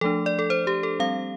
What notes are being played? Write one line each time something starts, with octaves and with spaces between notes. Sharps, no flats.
F3 A3 D4 A4
D5
A4
C5
G4
A4
G3 C4 F5